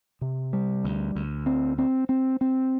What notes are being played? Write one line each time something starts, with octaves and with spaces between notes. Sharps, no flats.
C3
G3
D2
D2
C4
C4
C4
C4